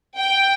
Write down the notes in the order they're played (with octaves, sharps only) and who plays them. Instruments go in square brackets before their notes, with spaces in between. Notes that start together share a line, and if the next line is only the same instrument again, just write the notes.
[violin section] G5